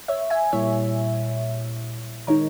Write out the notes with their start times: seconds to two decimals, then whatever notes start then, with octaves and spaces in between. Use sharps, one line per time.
0.08 C#5 E5
0.30 E5 G#5
0.53 A#2 G3 A#3 E4 C#5 E5
2.27 D#3 G#3 D#4 A#4 C#5